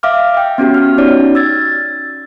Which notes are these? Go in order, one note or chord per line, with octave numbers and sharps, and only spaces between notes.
E5 F5 D6 F6
E5 G5
B3 C#4 F#4 G4
F6
C#4 D#4 F#4 C#5 D5
E6 G#6 A6